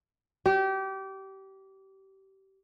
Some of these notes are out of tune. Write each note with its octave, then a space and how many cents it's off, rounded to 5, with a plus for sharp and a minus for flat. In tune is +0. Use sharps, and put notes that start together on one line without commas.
G4 -25